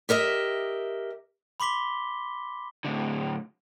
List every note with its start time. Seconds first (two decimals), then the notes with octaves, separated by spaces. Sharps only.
0.09 G4 A#4 D#5 E5
1.60 B5 C6 D6 B6 G7
2.84 A2 D3